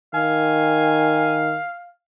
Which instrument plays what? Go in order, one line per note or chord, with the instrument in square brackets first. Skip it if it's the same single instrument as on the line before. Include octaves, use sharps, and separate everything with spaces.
[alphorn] D#3 [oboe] F5 [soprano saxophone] G#5